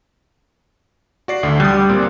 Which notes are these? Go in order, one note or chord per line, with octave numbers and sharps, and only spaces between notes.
F#4 D5 C7
D2 D3
G3 D#6 F#6
A#2 C4